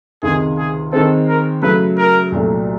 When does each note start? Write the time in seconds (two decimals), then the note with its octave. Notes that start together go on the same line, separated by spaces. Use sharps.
0.23 C#2 C3 D#3 G#3 G#4
0.57 G#4
0.93 D#3 G#3 C4 A4
1.28 A#4
1.62 C#3 F#3 A3 B4
1.97 A#4
2.32 C2 A#2 F#3 A3